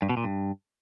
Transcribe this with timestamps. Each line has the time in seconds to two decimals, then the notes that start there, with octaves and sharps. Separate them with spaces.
0.02 G2
0.09 B2
0.17 A#2
0.24 G2